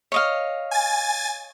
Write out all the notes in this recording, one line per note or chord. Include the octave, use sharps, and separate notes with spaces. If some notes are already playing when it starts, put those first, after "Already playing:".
C#5 D#5 F5
G#5 A6